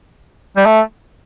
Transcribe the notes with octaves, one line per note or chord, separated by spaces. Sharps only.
G3
A3